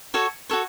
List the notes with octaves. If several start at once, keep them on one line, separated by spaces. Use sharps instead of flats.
F#4 A4 C#5
F#4 A4 C#5